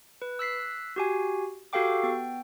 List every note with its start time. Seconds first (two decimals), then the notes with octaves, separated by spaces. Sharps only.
0.22 B4
0.39 E6 F#6 B6 C7
0.96 F#4 G4 G#5
1.73 F#4 G4 A4 F5 G5 D6
2.03 B3 G5